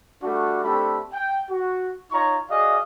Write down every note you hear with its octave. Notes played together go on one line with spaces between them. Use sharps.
G3 A3 D4 F#4
A3 C4 D4 G4 A4 B5
G5
F#4
D#4 F4 C#5 A#5 C#6
F#4 G#4 D5 D#5 F5